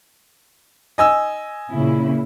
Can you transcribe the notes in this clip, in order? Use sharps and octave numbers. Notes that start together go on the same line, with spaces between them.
D#5 G#5 E6
A#2 C#3 E4